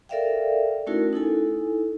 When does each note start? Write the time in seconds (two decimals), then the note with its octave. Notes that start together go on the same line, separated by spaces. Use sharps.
0.09 A4 A#4 D5 E5 F5 G5
0.87 A3 C#4 D#4 E4 F#4 A#4
1.13 D#4 E4 A4 G#5